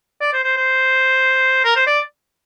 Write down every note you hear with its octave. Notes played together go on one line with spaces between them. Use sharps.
D5
C5
C5
C5
A#4
C5
D5